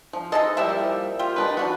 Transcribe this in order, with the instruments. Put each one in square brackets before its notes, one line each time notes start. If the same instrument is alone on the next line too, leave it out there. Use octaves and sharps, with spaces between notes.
[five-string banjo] F3
[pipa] G#3 D#4 A4 [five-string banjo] D#5 A5
[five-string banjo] F3 A#3 E4 [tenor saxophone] G3 [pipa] E5 G5
[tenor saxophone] F4 [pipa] G4
[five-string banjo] D#3 D4 D#4 [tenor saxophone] B4
[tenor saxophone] E3 [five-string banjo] D4 F#4